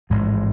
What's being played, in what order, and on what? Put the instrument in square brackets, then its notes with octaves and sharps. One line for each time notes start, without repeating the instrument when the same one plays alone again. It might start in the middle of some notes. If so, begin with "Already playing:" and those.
[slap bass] A1 G#2 F3 G#3